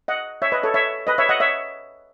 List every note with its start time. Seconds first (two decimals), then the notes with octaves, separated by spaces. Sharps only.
0.08 D#5 F#5
0.42 C#5 E5
0.52 B4 D#5
0.63 A4 C#5
0.74 C#5 E5
1.07 B4 D#5
1.18 C#5 E5
1.29 D#5 F#5
1.40 C#5 E5